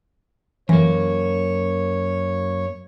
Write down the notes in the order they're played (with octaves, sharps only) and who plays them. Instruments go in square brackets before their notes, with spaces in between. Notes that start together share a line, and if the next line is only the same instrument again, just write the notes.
[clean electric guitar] F#2 A#3 [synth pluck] E3 [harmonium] C#5